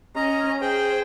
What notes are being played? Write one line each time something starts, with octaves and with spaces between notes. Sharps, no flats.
C#4 D#5 A#5
G#4 C5 G5